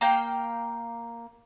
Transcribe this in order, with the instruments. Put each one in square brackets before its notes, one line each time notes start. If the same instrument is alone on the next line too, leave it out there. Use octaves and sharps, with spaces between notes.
[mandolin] A#3 F5 G5